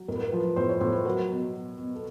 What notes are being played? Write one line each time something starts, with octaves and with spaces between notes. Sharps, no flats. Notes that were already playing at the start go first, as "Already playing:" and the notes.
Already playing: F#3
A2 A#4
B4
A#4
F3
B4
A2 C5
C#5
A2 C5
B4
F#3 A#4
B2
F#3
B2
A4